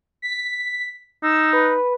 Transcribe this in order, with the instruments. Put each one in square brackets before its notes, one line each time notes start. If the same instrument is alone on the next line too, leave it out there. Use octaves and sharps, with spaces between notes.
[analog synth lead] B6
[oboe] D#4 [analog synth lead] E6
[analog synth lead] B4